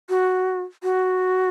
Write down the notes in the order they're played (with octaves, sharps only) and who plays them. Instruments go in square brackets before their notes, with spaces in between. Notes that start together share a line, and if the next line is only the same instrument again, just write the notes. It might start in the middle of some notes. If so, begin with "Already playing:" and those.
[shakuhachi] F#4
F#4